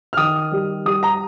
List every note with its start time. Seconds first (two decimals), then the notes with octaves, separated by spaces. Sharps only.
0.13 F6
0.17 D#3 D#6
0.52 G3
0.85 G3 D#6
1.03 A#5